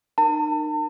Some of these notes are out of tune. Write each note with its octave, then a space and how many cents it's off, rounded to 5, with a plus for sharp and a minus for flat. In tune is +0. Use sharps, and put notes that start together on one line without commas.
D#4 -35 A#4 +0 A5 +40